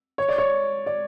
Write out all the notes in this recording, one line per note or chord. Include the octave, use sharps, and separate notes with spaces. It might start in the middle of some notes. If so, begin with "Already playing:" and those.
C#5
D5
C#5
D5